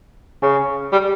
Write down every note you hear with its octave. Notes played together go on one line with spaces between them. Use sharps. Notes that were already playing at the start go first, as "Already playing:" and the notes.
C#3
G3